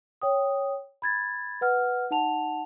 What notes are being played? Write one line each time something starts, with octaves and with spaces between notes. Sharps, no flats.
C#5 G5 D#6
B5 G#6 A6
B4 F#5 F6
D#4 F#5 A5 F7